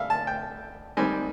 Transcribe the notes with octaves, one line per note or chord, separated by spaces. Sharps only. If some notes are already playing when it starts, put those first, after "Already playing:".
Already playing: G3 E5 F5
A5
G5
G#2 D#3 G3 C4 G#5